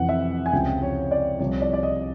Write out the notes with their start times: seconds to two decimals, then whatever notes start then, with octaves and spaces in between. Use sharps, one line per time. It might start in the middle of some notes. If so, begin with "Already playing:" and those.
Already playing: F2 C3 E3 F#5
0.09 E5
0.46 G#5
0.52 C#2 C3 F3 G5
0.82 C#5
1.11 D5
1.39 C2 C3 F3 C#5
1.61 D5
1.73 D5
1.83 D#5